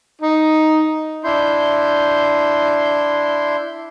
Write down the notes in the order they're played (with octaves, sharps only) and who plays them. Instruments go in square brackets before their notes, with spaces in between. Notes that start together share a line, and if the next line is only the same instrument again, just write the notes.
[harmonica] D#4
[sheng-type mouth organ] D4 E4 C6 G6